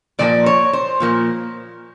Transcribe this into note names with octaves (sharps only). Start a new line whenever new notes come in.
A#2 F3 A#3 D5
C#5
C5
A#2 F3 A#3